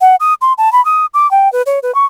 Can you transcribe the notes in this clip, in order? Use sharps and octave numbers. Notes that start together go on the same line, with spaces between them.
F#5
D#6
C6
A5
B5
D#6
D6
G5
B4
C#5
B4
C#6